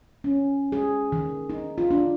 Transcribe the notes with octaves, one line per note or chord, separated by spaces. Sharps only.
C#4
G#4
D#3
D#4
F4
D4